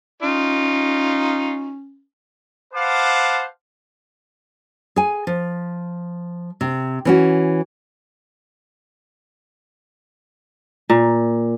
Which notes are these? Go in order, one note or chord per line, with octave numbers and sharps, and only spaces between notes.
C#4 D#4 F4
B4 C5 F5 F#5 A5 D6
G#4 G#5
F3
C3
E3 C#4 F#4
A#2